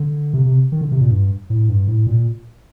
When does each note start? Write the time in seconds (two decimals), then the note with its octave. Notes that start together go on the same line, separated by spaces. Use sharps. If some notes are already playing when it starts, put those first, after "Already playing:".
Already playing: D3
0.34 C3
0.46 C3
0.72 D#3
0.81 D3
0.92 C3
1.01 A#2
1.11 G2
1.50 A2
1.69 G2
1.87 A2
2.07 A#2